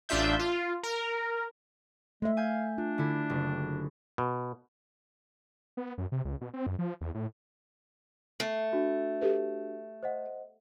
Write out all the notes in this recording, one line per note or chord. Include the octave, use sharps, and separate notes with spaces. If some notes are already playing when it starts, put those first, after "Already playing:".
A1 D4 F4 E5 G6
F4
A#4
G#3 A3 E5
F5 G#5 G6
D4 F4
D3 E4
F#1
B2
B3
F#2
C3
C#2
B2
C4
F#2
F3
E2
A2
A3 C7
D4 F#4
G4 A4 B4
C5 D#5 F#5